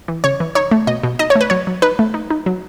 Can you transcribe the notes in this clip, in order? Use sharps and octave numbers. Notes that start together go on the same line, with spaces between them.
E3
C#3 C#5
E3
D#4 C#5
A3
B2 D#5
B2
D#4 D#5
C#5
A3
B4
F#3 C#5
F#3
D#4 B4
A3
D#4
D#4
F#3